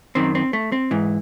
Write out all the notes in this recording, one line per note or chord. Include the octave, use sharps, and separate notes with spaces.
F#2 D#3 C4
C4
A3
C4
G#2 E3